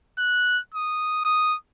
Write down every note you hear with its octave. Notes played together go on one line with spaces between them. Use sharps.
F#6
D#6
D#6